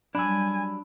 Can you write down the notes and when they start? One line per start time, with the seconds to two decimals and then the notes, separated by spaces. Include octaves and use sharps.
0.15 F#3 G3 D4 D5 G#5 B5 E6